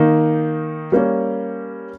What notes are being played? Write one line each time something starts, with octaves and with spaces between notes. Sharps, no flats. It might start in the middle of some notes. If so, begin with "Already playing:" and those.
Already playing: D#3 A#3 D#4
G3 A#3 C#4